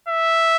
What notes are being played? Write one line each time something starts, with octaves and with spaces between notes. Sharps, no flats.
E5